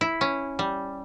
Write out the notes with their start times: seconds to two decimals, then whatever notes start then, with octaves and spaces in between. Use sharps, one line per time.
0.01 E4
0.21 C#4
0.59 G3